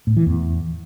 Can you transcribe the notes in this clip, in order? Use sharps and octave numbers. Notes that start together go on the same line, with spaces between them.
A2
E3
E2